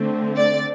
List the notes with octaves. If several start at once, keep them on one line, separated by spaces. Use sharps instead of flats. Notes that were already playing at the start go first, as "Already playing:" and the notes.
Already playing: D3 A3 C4
D5